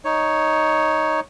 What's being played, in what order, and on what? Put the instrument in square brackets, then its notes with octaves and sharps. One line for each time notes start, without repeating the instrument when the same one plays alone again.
[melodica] D#4 C#5